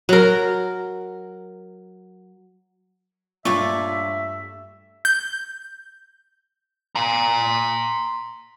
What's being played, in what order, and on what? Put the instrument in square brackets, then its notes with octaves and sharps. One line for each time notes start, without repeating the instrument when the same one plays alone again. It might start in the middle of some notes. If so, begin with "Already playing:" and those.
[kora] F#3 A#4
[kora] G2 A3 C#5 [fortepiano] A#2 [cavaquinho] F4 D5 C#6 [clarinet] E5
[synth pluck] G6
[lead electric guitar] A#5 C6